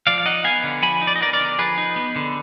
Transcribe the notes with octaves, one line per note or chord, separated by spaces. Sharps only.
F3 D5 F5
F5
D#4 D#5 F#5
B3 F5 G#5
D3
F3 G#5 B5
D#4
D5
D#5
B3 A#4 D5
A#4 D5
D3
F3 G#4 B4
D#4
B3
D3